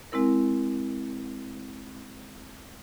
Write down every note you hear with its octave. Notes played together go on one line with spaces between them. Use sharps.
G#3 C4 E4 A#4